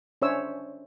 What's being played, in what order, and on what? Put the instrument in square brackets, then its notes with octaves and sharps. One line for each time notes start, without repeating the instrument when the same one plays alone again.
[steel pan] C#4 D4 C5 C#5 E5 E6